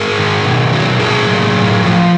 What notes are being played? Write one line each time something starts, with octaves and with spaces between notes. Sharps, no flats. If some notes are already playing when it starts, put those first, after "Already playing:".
Already playing: G#2 G#4 A#4
D#3
B2
F#3
A2 G#4 A#4
F#3
A2
F3